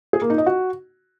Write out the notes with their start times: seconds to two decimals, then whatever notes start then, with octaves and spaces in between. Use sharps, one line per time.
0.13 G#4
0.22 A#3
0.30 D#4
0.38 D#5
0.46 F#4